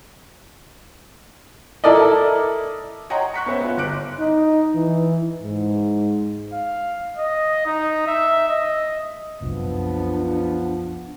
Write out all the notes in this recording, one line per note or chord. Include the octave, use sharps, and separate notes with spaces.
E4 A4 A#4 D5 D#5
C#5 D#5 F#5 G5 A#5 C6
C#6 F#6 B6 C#7
B3 C#4 C5 E5
B3 C#4 F4
G1 D6 F#6 D7
D#4
E3
G#2
F5
D#5
D#4
E5
D#5
F#1 C2 F#2 F3 B3 D4